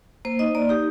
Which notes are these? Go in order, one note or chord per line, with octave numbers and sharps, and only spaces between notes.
A#3 C5
D#4 D#5
A#3 D5
D#4 G4